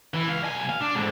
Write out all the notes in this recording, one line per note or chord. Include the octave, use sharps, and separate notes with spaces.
E3
C#2 F5
B1 G#5
F5
D4
G#2 D3